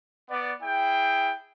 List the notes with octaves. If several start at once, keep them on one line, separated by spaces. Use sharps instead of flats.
B3 D5
E4 G#4 G5